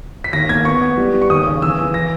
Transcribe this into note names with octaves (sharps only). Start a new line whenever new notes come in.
B6
D#2 A#6
A#3 G#6
B3 C#6
B3
G3
G3
C#6
D#2 D#6
C#3
E3 E6
E3
A#6